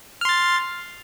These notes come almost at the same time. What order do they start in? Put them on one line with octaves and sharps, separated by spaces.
F6 C6 A6